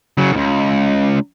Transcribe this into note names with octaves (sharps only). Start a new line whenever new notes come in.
C#3 F#3
C#2 G#2